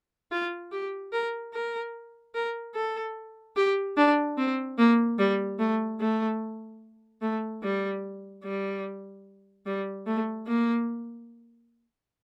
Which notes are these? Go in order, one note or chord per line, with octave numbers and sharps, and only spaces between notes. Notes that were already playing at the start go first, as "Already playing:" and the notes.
F4
G4
A#4
A#4
A#4
A4
G4
D4
C4
A#3
G3
A3
A3
A3
G3
G3
G3
A3
A#3